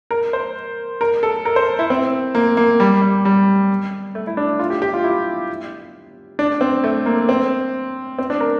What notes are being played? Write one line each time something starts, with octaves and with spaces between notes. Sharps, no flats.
A#4
C5
A#4
A4
A#4
C5
E4
C4
A#3
A#3
G3
G3
G3
A3
E4
D4
F4
G4
G4
F4
E4
D4
C4
A3
A#3
C4
C4
D4
A#4